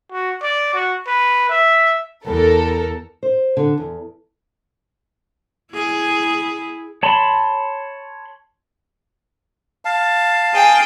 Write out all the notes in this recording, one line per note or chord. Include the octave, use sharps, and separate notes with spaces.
F#4
D5
F#4
B4
E5
E2 A4 A#4
C5
D3
E2
E4 G#4
C#5 A5 B5 C6
F5 A5
G#4 G5